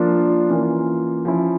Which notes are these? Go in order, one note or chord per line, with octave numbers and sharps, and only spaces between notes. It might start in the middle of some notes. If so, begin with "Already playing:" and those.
Already playing: F3 A#3 D4 F4
E3 A#3 C#4 F4
F3 C#4 E4